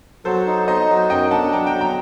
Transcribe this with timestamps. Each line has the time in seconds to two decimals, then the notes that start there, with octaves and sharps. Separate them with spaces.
0.25 F#3 A4 C5
0.47 D#4
0.68 D#4 C5 D#5
0.89 F#3
1.10 F#2 D#5 G5
1.31 D4 F#5 A5
1.52 F#3 G5 A#5
1.66 G5 A#5
1.73 F#3
1.81 G5 A#5